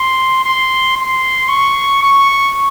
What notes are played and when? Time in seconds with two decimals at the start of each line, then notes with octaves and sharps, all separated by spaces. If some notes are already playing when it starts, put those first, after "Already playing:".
Already playing: C6
0.44 C6
0.96 C6
1.49 C#6
2.02 C#6